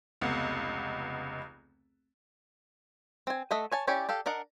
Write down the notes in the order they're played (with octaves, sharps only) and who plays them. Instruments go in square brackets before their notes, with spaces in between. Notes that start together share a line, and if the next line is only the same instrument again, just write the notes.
[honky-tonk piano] F1 C#2 B3
[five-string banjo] C4 G#5
A3 A4 D#5 E5 F#5
C#5 G#5 A5
C#4 E4 G4 C#5 D5
G4 A4 F5
D4 A#4 D#5 F#5